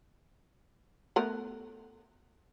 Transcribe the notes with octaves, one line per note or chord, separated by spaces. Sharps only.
A3 B3 A#4